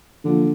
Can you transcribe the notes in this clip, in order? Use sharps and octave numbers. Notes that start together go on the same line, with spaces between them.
D3 F3 A#3 F4